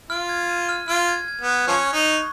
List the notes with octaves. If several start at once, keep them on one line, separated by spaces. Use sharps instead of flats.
F4 F6
G#6
D#7
F6
F4 F6
G#6
G#6
B3
G#6
F3 C#4 F#6
C#6
D#4
C#6